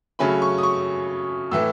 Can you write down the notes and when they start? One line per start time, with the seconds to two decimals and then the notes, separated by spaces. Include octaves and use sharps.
0.19 C#3 F#3 A3 C#4 B5
0.42 C#6
0.58 D#6
0.63 C#6
1.51 A2 E3 A3 E6